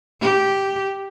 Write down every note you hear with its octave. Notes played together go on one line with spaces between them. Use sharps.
G4